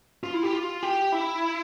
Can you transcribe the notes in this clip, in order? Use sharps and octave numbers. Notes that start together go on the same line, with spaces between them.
F4
E4
G4
F4
G4
E4